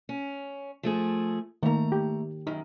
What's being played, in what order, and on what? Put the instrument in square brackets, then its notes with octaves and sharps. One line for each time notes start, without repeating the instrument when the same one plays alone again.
[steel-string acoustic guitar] C#4
F3 A3 G#4
[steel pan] D#3 A#3 [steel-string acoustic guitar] A3 A#5
[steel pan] G4
[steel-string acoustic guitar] F#2 D#3 [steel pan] D#4